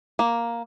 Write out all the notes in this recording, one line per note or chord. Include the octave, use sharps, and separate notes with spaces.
A#3